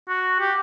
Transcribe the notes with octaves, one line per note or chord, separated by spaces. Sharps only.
F#4
G4